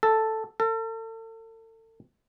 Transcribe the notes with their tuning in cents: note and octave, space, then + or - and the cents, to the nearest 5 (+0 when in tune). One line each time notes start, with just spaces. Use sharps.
A4 +5
A4 +40